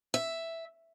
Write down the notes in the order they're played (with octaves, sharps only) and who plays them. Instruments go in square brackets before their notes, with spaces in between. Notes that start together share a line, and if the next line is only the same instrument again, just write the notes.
[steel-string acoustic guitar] E5